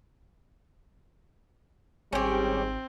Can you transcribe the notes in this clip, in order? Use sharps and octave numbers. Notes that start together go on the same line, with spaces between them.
G#1 G#2 G3 C4 C#4 G4 G#4